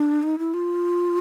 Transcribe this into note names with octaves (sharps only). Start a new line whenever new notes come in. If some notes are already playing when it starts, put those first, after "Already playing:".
Already playing: D4
D#4
E4
F4